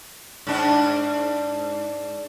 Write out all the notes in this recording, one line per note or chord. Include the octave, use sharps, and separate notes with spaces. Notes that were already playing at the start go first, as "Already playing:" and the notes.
G#2 D4